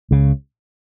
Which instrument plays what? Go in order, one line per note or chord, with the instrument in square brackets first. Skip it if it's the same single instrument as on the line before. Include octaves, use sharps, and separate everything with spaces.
[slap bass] C#2 C#3